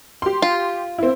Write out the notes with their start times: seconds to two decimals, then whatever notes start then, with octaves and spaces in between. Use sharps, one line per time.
0.22 G4 C6
0.42 F4
0.98 C4 E4